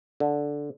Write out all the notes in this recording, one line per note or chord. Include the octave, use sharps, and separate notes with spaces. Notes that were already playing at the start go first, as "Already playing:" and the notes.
D3